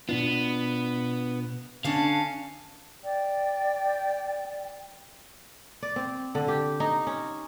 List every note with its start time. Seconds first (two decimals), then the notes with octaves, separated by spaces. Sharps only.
0.09 B2 B3 D4 F4
1.85 D3 C#4 D4 F5 A5
3.03 D5 G5
5.82 D5
5.96 C4
6.35 D3
6.48 G4
6.80 D#4
7.07 C#4